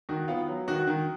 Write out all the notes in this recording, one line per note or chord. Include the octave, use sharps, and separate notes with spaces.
D#3 F#4
B3 F4
F#3
D#3 F#4
D#3